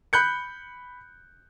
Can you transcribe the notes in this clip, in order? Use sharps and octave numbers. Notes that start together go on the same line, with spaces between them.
B5 F#6 G6 C#7